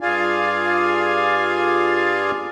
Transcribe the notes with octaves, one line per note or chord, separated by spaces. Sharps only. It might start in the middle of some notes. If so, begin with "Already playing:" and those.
G2 F4 G#4 D5 F5 G#5